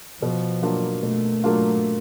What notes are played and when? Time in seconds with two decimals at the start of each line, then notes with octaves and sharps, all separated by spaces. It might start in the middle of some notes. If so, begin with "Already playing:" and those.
0.22 B2 F3
0.62 F#3 A#3 D4 F4
1.03 B2 A3
1.44 F#3 A#3 D4 F4